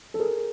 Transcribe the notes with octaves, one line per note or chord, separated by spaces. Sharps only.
A4
G#4 A#4